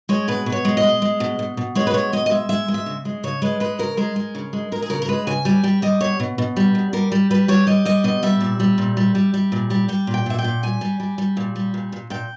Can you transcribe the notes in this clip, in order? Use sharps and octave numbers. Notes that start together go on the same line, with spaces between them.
G#3 C#5
B2 B4
B2
C#5
G#3
D#5
G#3
G#3
B2
B2
B2
G#3 C#5
B4
B2 C#5
G#3 D#5
D#5
G#3 E5
G#3 E5
G#3
E5
C#3
G#3
C#3 C#5
G#3 B4
G#3 B4
C#3 A#4
G#3 A#4
G#3
C#3
G#3
G#3 A#4
G#4
C#3 A#4
A#4
G#3 B4
C#3 G#5
G3 G#5
G3 G5
G3 D#5
B2 C#5
B2
B2
G3
B2
G3 A#4
G3
G3 B4
G3 C#5
G3 D#5
G3 D#5
B2 D#5
G3 E5
A#2
G3
A#2
G3
G3
G3
A#2
G3
G3 G5
A#2
G5
A#2 E5
G5
A#2
G3 G#5
G3
G3
G3
A#2
G3
A#2
A#2
A#2 G5